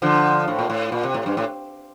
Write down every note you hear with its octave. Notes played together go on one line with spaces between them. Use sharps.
D3 F3
A2
A#2
A2
A#2
C3
A2
G2
A2